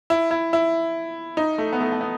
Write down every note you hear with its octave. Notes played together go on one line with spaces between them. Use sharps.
E4
E4
E4
D#4
A3
B3
A3
A3
B3